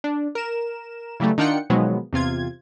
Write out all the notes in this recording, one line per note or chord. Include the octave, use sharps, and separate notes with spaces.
D4
A#4 E7
C#3 E3 F#3 G3 A3
D#3 D4 F4 F#5 G5 C#7
B2 D#3 F3 F#3 G#3 B3
E2 C3 F4 G#6